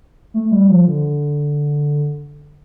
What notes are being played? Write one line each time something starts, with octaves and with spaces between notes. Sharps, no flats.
A3
G3
F3
D3